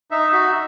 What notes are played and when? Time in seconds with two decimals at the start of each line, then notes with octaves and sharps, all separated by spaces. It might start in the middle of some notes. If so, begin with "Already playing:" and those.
0.11 D#4 E5
0.32 F#4 E5